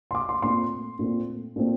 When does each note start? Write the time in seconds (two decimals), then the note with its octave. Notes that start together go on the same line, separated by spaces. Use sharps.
0.11 C6
0.15 D6
0.29 C6
0.42 A#2 A3 C4 C6
0.99 A#2 A3 C4
1.56 A#2 A3 C4